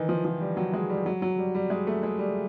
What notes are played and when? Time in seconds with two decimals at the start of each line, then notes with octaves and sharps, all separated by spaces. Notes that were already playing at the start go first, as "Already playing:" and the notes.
Already playing: D#3 E3
0.09 F3
0.25 F3
0.41 G3
0.57 F#3
0.73 G#3
0.89 G3
1.06 F#3
1.22 F#3
1.38 G3
1.55 G3
1.70 G#3
1.87 A3
2.03 G#3
2.19 G3